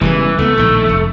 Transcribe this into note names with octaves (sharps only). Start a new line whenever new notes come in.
E1 C#3 E3 G3
C#2 A3 B3
A#1 A2 D#3
F1